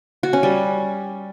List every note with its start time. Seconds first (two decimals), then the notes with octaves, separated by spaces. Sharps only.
0.23 F#4
0.33 C#4
0.43 G3